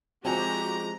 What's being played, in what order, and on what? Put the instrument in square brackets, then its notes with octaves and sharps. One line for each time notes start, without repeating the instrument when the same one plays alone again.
[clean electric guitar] F3 G#3 [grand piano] C4 G#5 F7 [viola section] F#4 G4 [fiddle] A#5